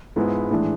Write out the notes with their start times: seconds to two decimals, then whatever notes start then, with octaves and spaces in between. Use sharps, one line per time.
0.16 G#2 F3 G#3 B3 E4
0.51 A2 E3 G#3 D4